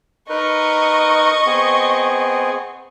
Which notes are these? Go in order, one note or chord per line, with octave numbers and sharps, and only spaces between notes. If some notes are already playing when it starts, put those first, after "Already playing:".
D#4 A#4 B4 D#5 C#6
B3 C4 G#4